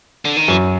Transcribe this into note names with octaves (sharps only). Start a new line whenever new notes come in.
D3
D#3
F#2 E3 F#3